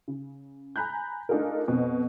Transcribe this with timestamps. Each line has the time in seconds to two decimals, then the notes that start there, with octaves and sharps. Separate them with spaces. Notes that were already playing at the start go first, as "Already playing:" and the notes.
0.08 C#3
0.76 G#5 A#5 B5 F#6 G6
1.29 A3 D4 D#4 F4 G#4 A#4
1.68 F2 B2 C4